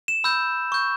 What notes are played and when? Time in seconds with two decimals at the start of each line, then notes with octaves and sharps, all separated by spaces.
0.08 E7
0.24 B5 E6 G6
0.72 C#6 G6